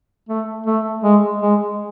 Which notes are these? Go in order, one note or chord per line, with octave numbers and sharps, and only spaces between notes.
A3
A3
G#3
G#3